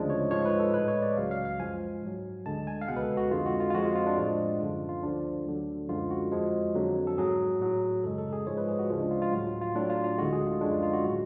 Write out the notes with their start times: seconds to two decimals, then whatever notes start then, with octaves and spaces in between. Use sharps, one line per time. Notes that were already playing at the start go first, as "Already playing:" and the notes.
Already playing: D2 C#3 F3 G#3 D4
0.10 C#5
0.31 G#2 F3 G#3 C#5
0.45 B4
0.59 A4
0.74 A2 G#3 B4
0.88 C#5
1.02 D5
1.17 C#2 C#3 F#3 F5
1.31 F5
1.45 F5
1.60 F#2 F3 G#3 G#5
2.02 G#2 F#3
2.46 D2 D3 G#3 A5
2.67 G#5
2.81 F5
2.88 C#2 B2 G#3 F#5
2.97 B4
3.03 A4
3.17 F#4
3.31 F2 D3 G#3 F4
3.46 F#4
3.60 F4
3.70 F4
3.74 F2 F3 G#3 F#4
3.85 F4
3.95 F4
4.07 D4
4.17 A2 F3 G#3
4.60 F#2 D3 F3 F4
4.89 F4
5.03 D2 D3 F3 D4
5.46 D2 D3 F#3
5.89 F#2 D3 F3 G#3 F4
6.11 F#4
6.32 F2 F3 G#3
6.75 F2 D3 F#3
7.07 A4
7.18 G#2 F#3 G#4
7.61 A2 F#3
8.04 F#2 C#3 G#3 A4
8.18 A4
8.33 G#4
8.47 G#2 F3 G#3 C#5
8.58 B4
8.68 G#4
8.79 F#4
8.90 D2 C#3 F3 G#3 F4
9.00 D4
9.11 F4
9.22 F4
9.32 A2 F#3 F#4
9.47 F4
9.61 F4
9.76 A2 F#3 D4
9.90 F4
10.04 F4
10.18 D2 D3 G#3 F#4
10.33 G#4
10.47 F4
10.61 F#2 D3 F3 G#3 D4
10.72 F4
10.83 F4
10.93 F#4
11.04 A2 F#3 F#4